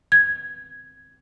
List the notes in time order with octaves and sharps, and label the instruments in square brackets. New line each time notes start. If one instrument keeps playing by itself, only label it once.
[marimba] G#6